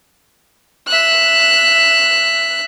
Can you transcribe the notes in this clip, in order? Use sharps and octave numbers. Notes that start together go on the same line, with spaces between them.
E5 F#6